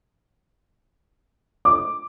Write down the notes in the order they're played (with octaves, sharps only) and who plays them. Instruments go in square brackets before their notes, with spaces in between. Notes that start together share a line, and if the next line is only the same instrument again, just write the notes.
[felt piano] D6